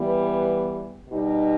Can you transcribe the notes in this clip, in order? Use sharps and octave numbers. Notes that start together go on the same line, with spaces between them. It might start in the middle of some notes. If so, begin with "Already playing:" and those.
Already playing: E3 G3 B3
B2 G3 D#4 G4